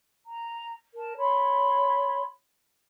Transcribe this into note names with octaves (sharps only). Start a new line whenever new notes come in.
A#5
A#4 A5
C#5 B5 C6